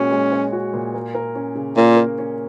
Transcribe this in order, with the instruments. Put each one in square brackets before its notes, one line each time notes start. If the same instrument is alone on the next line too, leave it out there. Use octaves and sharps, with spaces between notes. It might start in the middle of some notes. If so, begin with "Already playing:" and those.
Already playing: [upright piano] A#2 G#3 F#4 [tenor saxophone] C#4
[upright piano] G#3
C#5
F#4
A#2
A#3
A#4
C#4
C#3
[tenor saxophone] A#2 [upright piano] A#3
[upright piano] A#4
C#4